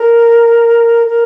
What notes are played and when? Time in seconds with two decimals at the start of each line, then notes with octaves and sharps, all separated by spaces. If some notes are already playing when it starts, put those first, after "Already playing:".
Already playing: A#4
1.07 A#4